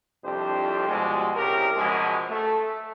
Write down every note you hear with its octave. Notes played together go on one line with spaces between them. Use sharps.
C2 F2 D4 G4 C5
B2 F3 G3 G#3
C2 C#3 G4 A#4
F#2 B2 F3 G#3
A3